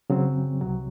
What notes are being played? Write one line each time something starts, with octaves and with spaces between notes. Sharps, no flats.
C#3 F#3 C4
C2 C3 F#3